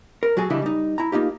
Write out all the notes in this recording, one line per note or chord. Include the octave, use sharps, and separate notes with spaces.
A#4
F#3 F#4 G#4 A4
C#3 E3 G3 D4 E4 D#5
G3 D#4
E4 A#5
A#3 D#4 F4 G4